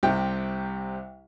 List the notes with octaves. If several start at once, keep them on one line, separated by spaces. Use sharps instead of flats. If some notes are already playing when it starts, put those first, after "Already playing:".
C2 C3 G5